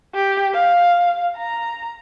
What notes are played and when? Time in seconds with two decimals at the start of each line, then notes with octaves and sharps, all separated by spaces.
0.14 G4
0.54 F5
1.37 A#5